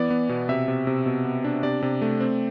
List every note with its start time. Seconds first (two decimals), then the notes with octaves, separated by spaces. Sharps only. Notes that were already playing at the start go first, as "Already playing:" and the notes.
Already playing: E3 B3 D5
0.10 B3
0.29 B2
0.49 C3 E5
0.68 C3
0.87 C3
1.06 B2
1.25 B3
1.44 D4
1.63 C3 D5
1.82 C3
2.02 A3
2.20 C4